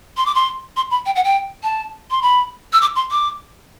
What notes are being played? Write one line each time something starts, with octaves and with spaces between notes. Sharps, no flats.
C6
D6
C6
C6
B5
G5
F#5
G5
A5
C6
B5
E6
D6
C6
D6